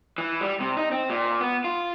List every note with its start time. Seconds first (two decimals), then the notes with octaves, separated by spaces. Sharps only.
0.18 E3
0.41 G3
0.60 C3
0.77 D#4
0.92 C4
1.10 A#2
1.41 B3
1.64 F4